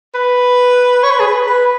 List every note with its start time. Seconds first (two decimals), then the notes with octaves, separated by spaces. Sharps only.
0.15 B4
1.03 C#5
1.11 B4
1.20 G#4
1.27 B4
1.47 B4